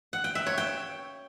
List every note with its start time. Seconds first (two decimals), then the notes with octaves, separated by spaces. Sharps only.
0.13 F#5
0.24 G5
0.35 E5
0.46 C#5
0.58 G5